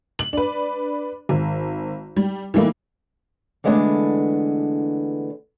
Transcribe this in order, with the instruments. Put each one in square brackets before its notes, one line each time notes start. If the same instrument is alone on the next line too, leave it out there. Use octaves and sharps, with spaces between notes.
[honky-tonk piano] F#7
D4 B4
G#1
G3
E3 G3 A3 A#3 D#4 E4
[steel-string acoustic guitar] D3 E3 G#3 A3 B3 D4